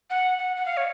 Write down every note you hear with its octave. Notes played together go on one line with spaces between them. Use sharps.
F#5
F#5
F#5
F5
C#5